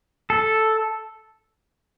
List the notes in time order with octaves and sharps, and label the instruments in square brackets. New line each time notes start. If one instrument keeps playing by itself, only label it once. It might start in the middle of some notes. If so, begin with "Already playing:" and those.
[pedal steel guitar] A4